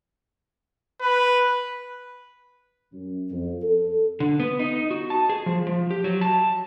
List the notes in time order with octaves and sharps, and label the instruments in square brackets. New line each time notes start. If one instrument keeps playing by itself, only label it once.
[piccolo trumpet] B4
[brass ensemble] F#2
F2
A4
[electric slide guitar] D3
B3
D#4
F#4
A5
G#4
F3
F3
G4
F#3
A5